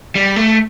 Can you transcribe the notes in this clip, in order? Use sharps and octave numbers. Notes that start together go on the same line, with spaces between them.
G3
A3